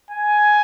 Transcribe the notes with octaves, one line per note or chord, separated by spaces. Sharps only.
G#5